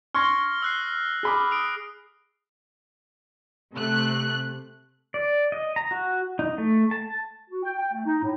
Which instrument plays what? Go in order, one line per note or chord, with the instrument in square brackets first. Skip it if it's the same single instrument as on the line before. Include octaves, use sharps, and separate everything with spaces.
[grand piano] C6 C#6 G#6 [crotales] F6 A#6 G7
[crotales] E6 F#6 C7
[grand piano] G#4 B5 D6
[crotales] D#6 D7
[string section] C3 A3 F#6
[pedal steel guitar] D5
D#5
A#5
F#4
D#4
A3
A5
[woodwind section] F#4
G5
G5
A3
D#4
A2